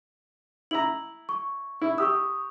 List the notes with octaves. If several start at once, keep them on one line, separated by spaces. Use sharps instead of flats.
E4 E5 A#5 F#7
C#6
E4
G4 C#6 D#6 E6